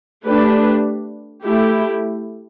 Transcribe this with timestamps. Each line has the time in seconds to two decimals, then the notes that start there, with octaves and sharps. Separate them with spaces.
0.25 A3 D4 G4 B4
1.43 A3 E4 G4